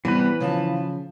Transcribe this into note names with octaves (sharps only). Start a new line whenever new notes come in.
C3 E3 G3 B3 B4
C#3 F3 A5